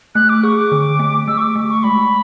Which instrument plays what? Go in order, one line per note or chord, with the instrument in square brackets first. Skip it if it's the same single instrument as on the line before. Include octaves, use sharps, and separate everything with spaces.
[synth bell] A3 [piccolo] F#6
[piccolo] D6
[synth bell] G#4 [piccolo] C#6
[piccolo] D6
[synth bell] D3
A3
[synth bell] A3 [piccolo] E6
[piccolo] C#6
D6
[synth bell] A3
[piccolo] C#6
[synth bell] G#3 [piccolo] B5